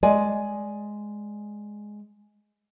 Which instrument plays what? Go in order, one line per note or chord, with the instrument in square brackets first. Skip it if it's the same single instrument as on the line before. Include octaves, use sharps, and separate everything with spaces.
[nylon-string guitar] G#3 D5 G#5